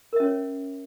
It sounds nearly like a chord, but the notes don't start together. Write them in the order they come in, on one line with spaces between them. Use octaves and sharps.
A#4 E5 C#4 C#5